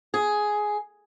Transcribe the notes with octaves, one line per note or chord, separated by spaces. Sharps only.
G#4